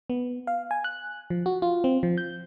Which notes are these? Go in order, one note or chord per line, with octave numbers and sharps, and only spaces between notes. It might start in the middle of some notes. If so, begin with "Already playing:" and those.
B3
F5
G#5
F#6
F3
F#4
F4
C4
F3
G6